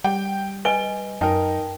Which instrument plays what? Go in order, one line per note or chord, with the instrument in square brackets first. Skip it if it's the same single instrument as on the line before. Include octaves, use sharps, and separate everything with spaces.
[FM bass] G3 [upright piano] G5
[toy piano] B4 D#5 G#5 [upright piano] G7
[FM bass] F#2 [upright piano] D#4 A#4 [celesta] G5 A5